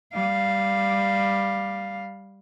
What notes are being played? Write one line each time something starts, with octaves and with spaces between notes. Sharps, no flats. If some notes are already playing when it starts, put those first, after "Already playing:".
G3 F5